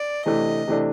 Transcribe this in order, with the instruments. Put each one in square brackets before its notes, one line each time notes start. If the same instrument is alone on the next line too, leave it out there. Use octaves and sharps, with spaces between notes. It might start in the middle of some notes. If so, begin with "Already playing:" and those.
Already playing: [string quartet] D5
[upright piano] C3 E3 A3 D4 [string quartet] D#5
[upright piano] C3 E3 A3 D4